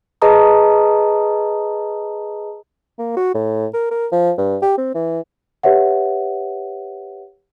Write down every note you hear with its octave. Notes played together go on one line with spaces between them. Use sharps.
G#4 B4 D#5 A5 A#5 D#6
A#3
F#4
A2
A#4
A#4
F3
G2
G4
C4
E3
G4 B4 C#5 E5 F#5